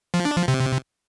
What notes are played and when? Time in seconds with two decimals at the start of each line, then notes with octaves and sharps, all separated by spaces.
0.14 F3
0.25 D4
0.37 F3
0.48 C3